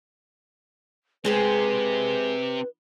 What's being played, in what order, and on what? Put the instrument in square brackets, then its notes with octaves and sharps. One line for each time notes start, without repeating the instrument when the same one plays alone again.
[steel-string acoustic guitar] G#3 G#4 C5 [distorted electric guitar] C4 G4 [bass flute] B4